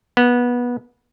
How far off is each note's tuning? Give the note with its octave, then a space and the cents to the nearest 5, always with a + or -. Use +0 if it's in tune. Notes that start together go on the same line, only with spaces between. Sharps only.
B3 -20